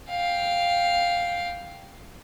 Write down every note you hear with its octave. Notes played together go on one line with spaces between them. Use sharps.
F5 G5